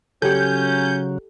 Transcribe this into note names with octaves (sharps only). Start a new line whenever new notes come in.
C#3 F#3 C#4 G4 A4 G6